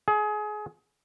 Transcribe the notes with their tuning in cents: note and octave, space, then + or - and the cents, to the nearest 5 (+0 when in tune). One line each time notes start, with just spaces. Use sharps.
G#4 +25